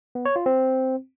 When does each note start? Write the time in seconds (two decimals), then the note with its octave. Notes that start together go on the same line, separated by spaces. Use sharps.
0.15 B3
0.25 C#5
0.36 F4
0.46 C4